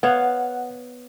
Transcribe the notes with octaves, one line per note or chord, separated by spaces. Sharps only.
B3 C#5 F5 F#5